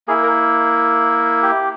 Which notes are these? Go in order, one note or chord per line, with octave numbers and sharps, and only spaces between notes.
A#3 E4 G#4
A#4
G4